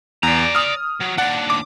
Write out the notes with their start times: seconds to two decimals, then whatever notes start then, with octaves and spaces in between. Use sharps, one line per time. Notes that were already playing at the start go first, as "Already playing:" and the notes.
0.23 E2 D5 A#5
0.55 D#6 F6
1.01 F#3
1.18 D#2 D4 F#5
1.50 D6